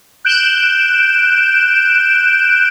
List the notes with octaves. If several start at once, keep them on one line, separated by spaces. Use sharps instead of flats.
F#6 G6 D7 E7